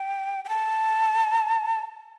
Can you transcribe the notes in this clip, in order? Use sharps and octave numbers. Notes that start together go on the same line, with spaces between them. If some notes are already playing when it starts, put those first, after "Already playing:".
Already playing: G5
G5
A5